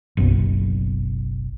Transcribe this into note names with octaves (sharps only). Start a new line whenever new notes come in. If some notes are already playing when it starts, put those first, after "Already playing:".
F#1 B1